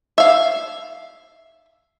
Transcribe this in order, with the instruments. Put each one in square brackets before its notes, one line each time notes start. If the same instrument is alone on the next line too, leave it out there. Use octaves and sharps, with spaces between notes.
[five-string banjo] E5 F5